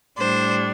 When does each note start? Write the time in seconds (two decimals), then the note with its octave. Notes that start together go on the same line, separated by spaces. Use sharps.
0.18 A2 G3 D4 C5